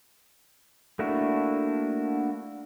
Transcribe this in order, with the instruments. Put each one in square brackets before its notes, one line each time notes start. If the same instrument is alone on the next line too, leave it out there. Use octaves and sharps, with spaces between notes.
[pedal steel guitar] A3 A#3 D4 E4 F#4